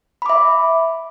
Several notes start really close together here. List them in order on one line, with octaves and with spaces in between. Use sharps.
B5 D6 E5